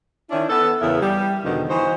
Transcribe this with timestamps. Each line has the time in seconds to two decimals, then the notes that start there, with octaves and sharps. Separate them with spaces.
0.30 D#3 C#4 D4 E4
0.49 B3 A4
0.81 E2 C#3 B3 E4 A#4
1.01 G3
1.44 E2 B2 D3 D#3 F3
1.69 E3 D#4 F#4 C5